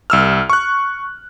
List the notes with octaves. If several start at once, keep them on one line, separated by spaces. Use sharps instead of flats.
C2 E6 F6
C#6 F#6